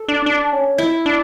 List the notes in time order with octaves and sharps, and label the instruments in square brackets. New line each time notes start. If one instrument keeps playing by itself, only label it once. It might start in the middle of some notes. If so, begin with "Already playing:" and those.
Already playing: [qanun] A4
[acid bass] D4
D4
C#4
[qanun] E4
[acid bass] D4